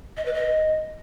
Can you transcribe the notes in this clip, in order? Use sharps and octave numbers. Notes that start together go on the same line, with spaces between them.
D#5
B4
D#5